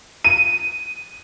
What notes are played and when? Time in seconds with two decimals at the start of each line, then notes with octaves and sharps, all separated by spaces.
0.24 D#7